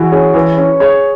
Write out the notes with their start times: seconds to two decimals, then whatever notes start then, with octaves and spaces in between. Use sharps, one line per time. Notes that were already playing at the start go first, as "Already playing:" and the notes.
Already playing: E3 F#4 G#4 B4
0.12 C#4 G#4
0.34 E3 B4
0.57 C#4
0.80 G#4 C#5